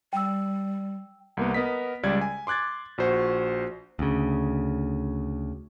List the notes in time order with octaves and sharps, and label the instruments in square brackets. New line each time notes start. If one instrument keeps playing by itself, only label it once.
[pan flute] G3 [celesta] G5 E6
[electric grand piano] C2 A#3 B3
B3 A#4 D#5 D#6 B6
C#2 G3 D5 G#6
G#5
C6 D6 F#6 G#6 A6
A#1 F#4 C5 C#6
[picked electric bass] D2 C#3